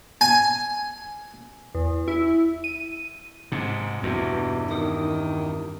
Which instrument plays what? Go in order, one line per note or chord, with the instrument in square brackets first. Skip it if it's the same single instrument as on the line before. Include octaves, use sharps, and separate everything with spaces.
[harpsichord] G#5
[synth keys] E2
E4
D#7
[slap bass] G#2 C3
[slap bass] E2 G2 [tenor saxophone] B2
[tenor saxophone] D#3